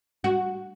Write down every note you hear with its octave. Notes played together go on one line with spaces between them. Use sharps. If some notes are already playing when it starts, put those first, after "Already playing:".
F#4